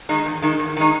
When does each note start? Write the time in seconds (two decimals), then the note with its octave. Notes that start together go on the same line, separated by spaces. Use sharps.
0.09 D#3 G#3 D#4
0.26 E2
0.42 D#3 G#3 D#4
0.60 E2
0.77 D#3 G#3 D#4